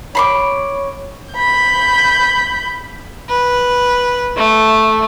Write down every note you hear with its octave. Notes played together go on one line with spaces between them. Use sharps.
C#5 B5 C6 D6
B5 G6
B4
A3